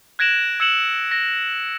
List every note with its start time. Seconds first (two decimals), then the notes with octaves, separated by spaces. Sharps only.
0.19 F#6 G#6 A#6 D7 E7 F#7
0.60 E6 G#6 C#7 E7 F#7
1.11 A#6